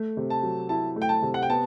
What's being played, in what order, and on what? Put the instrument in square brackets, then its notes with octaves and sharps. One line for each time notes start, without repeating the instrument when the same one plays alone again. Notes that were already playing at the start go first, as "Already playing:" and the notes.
Already playing: [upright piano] A3
C3
[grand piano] A5
[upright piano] F#3
[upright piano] E4 [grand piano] A5
[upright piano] A3
[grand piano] G5
A5
[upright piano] C3
[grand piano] F#5
G5
[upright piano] B3 [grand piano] A5